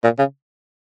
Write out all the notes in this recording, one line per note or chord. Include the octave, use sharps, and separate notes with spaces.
A#2
C#3